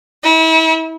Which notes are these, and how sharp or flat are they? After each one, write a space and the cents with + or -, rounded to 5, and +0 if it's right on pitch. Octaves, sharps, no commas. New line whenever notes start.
E4 -35